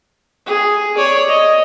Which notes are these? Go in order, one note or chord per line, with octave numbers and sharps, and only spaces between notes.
G#4
C#5 D5
D#5